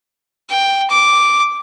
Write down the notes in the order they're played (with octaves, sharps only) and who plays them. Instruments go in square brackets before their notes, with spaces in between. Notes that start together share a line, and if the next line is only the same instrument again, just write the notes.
[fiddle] G5
D6